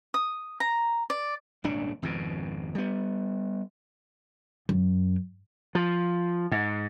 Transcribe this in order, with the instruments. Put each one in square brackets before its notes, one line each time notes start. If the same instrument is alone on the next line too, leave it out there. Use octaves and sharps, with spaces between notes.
[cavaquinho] D#6
A#5
D5
[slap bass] D#1 G#1 C#3 D4
G#1 F2 G#2 B2
G3 B3
[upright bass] F#2
[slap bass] F3
G#2